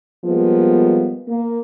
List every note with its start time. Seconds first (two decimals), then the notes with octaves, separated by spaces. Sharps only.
0.25 F3 G3 G#3 A#3 B3
1.28 A#3